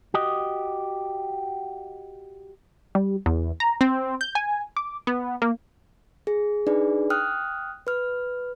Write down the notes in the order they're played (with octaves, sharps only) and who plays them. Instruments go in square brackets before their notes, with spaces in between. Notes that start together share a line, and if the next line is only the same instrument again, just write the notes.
[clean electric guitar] F#4 G4 D#5
[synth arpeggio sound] G3
E2
A#5
C4
G6
G#5
D6
B3
A#3
[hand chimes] G#4
D4 D#4 G#4 B4 D5
G5 D#6 F6 F#6
B4 F6